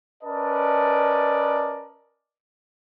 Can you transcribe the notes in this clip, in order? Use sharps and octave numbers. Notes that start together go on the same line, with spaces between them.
C#4 A#4 B4 D5 D#5 A5